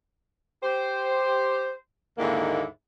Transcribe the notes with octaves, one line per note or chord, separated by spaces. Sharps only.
G4 C5
D#2 G#2 D3 A#3 E4